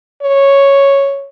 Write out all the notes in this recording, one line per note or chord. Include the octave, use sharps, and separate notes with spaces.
C#5